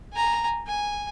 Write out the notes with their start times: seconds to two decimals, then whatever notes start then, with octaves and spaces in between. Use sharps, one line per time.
0.13 G#5 A#5
0.67 G#5